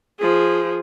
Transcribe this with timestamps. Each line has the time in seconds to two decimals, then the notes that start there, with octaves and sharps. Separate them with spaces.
0.20 F3 G#4